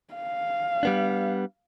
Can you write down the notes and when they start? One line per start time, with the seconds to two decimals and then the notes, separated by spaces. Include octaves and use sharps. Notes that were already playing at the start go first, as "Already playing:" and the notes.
0.14 F5
0.83 G3 B3 D4